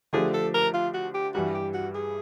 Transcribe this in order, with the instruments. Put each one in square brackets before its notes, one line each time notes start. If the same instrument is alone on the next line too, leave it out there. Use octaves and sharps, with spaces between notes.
[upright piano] D3 F3 A3 D4 G4 [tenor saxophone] G#4
[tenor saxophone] A4
A#4
F4
F#4
G4
[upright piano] G2 E3 G3 [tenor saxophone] F#4
[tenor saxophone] G4
F#4
G#4